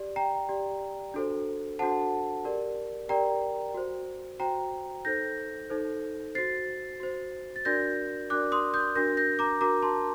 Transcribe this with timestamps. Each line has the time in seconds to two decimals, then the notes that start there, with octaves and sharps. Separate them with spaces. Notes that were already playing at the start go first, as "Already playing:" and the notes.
Already playing: G4 D5
0.16 G5 A#5
0.49 G4 D5
1.14 D4 F#4 A4 C5
1.79 D4 F#4 A4 C5 F#5 A5
2.45 G4 A#4 D5
3.09 G4 A#4 D5 G5 A#5
3.74 F#4 C5
4.39 F#4 C5 G5 A#5
5.05 D#4 A4 C5 G6 A#6
5.70 D#4 A4 C5
6.35 F#4 C5 A6 C7
7.00 F#4 C5
7.56 A6
7.65 D4 F#4 A#4 D5 G6 A#6
8.30 D4 F#4 A#4 D5 D6 F#6
8.52 C6 D#6
8.74 D#6 G6
8.95 D4 F#4 A#4 G6 A#6
9.17 G6 A#6
9.39 A#5 D6
9.61 D4 F#4 A#4 A#5 D6
9.82 A5 C6